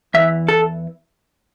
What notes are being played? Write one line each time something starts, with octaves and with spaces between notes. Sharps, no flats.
E2 E3 E5
A4